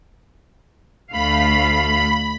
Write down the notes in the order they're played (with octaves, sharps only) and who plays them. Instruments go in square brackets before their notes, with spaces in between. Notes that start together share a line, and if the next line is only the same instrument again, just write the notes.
[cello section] D2 A3 F5 [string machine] B5